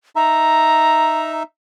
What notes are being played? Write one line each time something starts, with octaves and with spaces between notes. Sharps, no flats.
D#4 E5 A#5